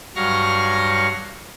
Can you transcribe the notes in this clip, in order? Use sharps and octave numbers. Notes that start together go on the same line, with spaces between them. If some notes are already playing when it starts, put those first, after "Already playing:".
G2 F#3 F5 C#6 F6 A#6